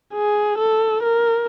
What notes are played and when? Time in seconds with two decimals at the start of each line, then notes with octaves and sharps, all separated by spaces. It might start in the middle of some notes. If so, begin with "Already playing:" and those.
0.14 G#4
0.58 A4
1.03 A#4